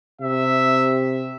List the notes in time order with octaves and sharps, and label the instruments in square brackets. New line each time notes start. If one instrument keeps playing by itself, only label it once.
[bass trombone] C3 [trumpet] E5